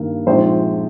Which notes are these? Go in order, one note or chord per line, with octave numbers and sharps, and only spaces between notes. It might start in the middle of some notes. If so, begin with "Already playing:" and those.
Already playing: G2 D#3 A#3
A#1 A#2 G#3 C4 D#4 C5